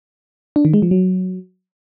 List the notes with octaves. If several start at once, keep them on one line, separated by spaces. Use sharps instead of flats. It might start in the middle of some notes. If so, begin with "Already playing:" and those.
D4
D#3
G#3
F3
F#3